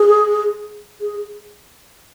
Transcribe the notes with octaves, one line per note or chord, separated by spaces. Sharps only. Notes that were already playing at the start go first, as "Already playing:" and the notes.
Already playing: G#4
G#4